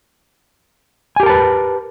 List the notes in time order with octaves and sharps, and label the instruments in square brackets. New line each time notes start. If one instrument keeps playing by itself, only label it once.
[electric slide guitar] G#5
G4
A#4
A5
B4